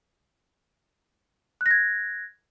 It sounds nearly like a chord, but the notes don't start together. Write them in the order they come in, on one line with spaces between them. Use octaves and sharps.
F#6 A#6 G#6